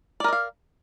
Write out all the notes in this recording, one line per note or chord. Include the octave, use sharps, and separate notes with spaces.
A#4 D5 D#5 F5